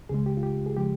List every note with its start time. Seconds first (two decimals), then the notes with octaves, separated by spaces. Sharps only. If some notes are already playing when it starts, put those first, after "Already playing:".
0.09 C#2 C#3 G#3 G#4
0.26 G4
0.37 F4
0.43 G4
0.66 G#4
0.77 C#3 F3 G#3 G4